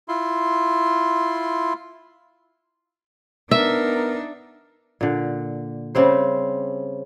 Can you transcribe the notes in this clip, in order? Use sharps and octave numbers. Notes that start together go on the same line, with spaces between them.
E4 F4 C6
B3 D4 D#4 A#4 E5
A#2 D3
C#3 G3 C4 C5